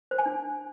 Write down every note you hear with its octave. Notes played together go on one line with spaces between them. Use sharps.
C5
G#5
D4